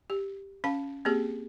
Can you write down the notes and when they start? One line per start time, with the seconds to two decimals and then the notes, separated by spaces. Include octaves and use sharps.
0.10 G4
0.64 C#4 F5 A5
1.05 A#3 C4 G4 G#4